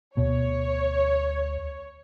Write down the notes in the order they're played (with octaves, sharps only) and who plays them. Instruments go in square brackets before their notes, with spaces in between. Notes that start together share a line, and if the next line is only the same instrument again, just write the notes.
[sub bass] D2 [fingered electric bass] B2 [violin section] C#5